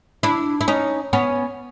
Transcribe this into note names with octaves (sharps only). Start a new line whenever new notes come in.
D4 E4
E4
C#4 D#4
B3 C#4